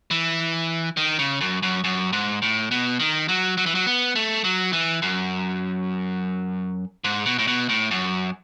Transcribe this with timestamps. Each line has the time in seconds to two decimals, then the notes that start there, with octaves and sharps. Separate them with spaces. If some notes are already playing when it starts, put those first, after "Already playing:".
0.11 E3
0.97 D#3
1.19 C#3
1.41 F#2
1.63 F#2
1.84 F#2
2.13 G#2
2.42 A2
2.71 B2
3.00 D#3
3.29 F#3
3.57 F#3
3.66 E3
3.75 F#3
3.86 B3
4.15 A3
4.44 F#3
4.73 E3
5.02 F#2
7.04 G#2
7.26 B2
7.39 A2
7.47 B2
7.69 A2
7.91 F#2